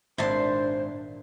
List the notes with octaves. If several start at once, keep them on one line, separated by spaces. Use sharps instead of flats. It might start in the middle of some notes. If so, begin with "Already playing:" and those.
G#1 A#2 D4 E4 C5 A5 C6